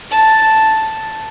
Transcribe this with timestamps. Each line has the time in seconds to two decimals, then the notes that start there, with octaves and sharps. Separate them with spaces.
0.11 A5